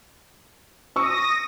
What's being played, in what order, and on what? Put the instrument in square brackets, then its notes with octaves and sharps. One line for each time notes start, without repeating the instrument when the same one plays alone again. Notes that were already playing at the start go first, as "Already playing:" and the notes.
[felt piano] C#6 E6 [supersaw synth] D#6 A#6